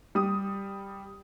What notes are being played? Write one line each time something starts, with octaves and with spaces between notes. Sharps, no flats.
G3 D#6